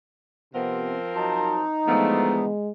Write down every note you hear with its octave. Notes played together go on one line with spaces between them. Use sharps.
C3 F3 B3 C4 A#4
F#3 D#4 C5 A5
D3 E3 F3 G#3 A3 B3